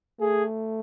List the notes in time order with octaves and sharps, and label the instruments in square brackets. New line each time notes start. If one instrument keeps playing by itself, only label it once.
[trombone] A3 [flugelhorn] G#4